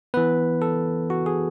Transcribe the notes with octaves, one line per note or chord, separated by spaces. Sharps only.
E3 B3 B4
A4
F#4
G#4